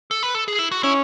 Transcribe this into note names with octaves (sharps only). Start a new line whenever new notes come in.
A4
B4
A4
G#4
E4
F#4
C#4 E4